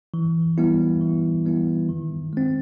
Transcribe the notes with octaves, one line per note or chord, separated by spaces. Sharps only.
E3
G3 B3 E4
E3
G3 B3 E4
D#3
G#3 C4